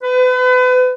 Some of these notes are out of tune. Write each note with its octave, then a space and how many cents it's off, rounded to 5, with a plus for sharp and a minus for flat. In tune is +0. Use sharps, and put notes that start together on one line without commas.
B4 +35